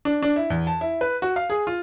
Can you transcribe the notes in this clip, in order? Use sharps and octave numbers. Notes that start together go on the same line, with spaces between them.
D4
D4
E4
E2
A5
E4
B4
F#4
F5
G#4
F4